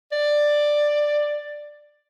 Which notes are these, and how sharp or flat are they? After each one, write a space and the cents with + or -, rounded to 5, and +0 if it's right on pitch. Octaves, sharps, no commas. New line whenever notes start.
D5 +10